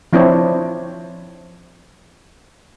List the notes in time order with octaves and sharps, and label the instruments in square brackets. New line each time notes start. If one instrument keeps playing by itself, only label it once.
[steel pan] F3 C4 D4 E4 C5 C#5